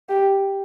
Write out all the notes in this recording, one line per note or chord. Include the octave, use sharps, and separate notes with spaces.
G4